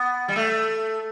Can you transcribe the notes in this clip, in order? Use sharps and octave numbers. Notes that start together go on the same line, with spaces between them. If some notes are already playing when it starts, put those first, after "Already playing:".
Already playing: B3
G3
A3